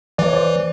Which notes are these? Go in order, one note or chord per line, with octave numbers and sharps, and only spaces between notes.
E3 D5
C#5
C5 D5